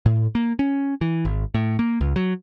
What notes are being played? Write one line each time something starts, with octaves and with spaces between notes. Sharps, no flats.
A2
A#3
C#4
E3
G#1
A2
A#3
C#2
F#3